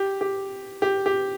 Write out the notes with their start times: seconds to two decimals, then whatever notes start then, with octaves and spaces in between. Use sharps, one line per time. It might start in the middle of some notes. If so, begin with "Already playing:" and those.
Already playing: G4
0.21 G4
0.82 G4
1.06 G4